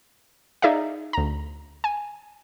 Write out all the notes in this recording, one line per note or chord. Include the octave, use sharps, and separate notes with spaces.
D#4 G#4 D5 E5 F5
D2 A#5
G#5